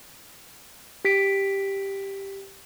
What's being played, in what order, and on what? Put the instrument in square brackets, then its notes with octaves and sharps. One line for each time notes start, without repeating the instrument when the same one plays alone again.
[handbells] G4 B6 D7